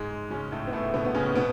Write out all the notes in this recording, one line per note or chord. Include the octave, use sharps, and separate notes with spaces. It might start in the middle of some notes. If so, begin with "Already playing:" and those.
Already playing: G#2 G#3
C#3 C#4
A2 A3
B3
A2 A3
B2 B3
B3
C#3 C#4
B2 B3